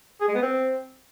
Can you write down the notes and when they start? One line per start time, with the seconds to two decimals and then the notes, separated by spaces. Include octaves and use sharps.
0.21 G#4
0.28 G#3
0.35 B3
0.42 C4